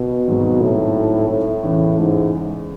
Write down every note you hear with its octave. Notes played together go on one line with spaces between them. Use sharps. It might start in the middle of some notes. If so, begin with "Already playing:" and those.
Already playing: B2
G#1 G#2 F#3
A2
A2
E2 C#3 E3
G#2